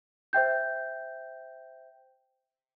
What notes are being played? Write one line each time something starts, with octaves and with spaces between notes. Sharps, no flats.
C5 E5 G5 G6